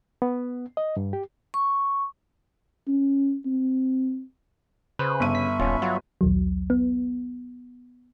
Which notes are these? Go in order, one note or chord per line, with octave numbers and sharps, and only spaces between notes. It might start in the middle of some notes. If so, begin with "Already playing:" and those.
B3
D#5
G2
G4
C#6
C#4
C4
C#3 B4 C5
G1 E5 B5 C#6 D#7
B6
D#1 C#4 F4
F#3 F4 F#4
A#1 D#2 F#3
B3